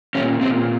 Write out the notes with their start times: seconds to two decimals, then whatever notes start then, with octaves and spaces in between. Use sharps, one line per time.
0.15 A#2 C#4
0.41 A#2 C4